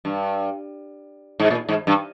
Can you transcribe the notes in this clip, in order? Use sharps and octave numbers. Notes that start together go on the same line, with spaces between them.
G2
G#2
A#2
G#2
G2